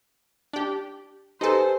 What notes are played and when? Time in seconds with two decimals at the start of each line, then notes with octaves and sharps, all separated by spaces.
0.53 D4 G4
1.41 D#4 G4 A4 B4 C5 G#5